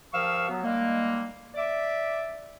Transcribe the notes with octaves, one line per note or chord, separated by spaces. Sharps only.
G2 F3 A#4 F5 C#6 E6
F#3 B3
D#3 G3 G#3 A#3
D5 E5 D6